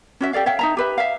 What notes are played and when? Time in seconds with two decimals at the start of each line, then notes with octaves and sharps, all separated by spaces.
0.21 C#4 F#4 E5
0.33 G4 A4 D5 F5
0.46 C#5 E5 F5 G5
0.59 D#4 E5 A#5
0.77 G4 B4 E5
0.98 E5 F5